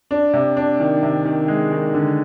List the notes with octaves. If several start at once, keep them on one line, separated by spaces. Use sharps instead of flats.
D4
C3
D4
D#3
C3
D#3
G#3
D#3
D3